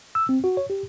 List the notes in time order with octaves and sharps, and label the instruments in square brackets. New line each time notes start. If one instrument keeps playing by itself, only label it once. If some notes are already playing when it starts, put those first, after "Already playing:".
[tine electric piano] E6
C4
F#4
C#5
G4